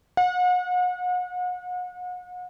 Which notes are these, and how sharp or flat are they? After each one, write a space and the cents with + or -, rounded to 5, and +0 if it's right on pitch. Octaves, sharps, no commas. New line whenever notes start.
F#5 -40